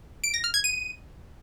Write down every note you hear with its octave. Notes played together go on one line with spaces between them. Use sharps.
D7
A#6
F6
G#6
D#7